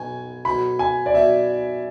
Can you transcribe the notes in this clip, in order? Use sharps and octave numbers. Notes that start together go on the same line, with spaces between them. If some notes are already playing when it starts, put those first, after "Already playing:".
Already playing: B1 B2 F#3 G#5
B1 B2 F#3 B5
G#5
D5
B2 F#3 E5